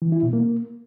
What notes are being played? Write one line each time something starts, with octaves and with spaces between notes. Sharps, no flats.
E3
E4
B2
A#3